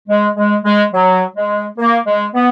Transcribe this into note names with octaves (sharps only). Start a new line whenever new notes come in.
G#3
G#3
G#3
F#3
G#3
A#3
G#3
B3